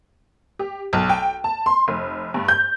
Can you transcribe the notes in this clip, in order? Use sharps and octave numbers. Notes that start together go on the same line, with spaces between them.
G4
B1
G5
A5
C6
F1
G2
G6